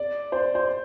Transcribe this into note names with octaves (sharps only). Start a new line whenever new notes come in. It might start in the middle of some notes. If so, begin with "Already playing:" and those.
Already playing: D5
C5
C5